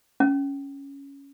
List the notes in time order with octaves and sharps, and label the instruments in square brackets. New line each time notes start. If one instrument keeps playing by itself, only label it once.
[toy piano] C#4